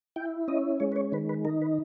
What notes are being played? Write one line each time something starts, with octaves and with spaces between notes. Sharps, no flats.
E4 G5
C#4 D#5
G#3 C#5
B4
C#5
D#3 B4
B4
D#4 A#4
B4